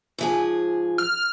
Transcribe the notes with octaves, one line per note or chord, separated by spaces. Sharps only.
G#2 F3 G#4
F6